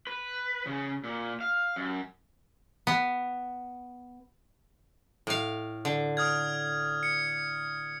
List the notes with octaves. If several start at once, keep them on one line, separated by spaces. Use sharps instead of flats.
B4
C#3
A#2
F5
F#2
B3
A2 F5
D3
D#6 F6 G#6
C#7